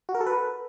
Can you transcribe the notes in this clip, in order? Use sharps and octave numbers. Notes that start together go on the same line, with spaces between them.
F#4
A#4
A4
B4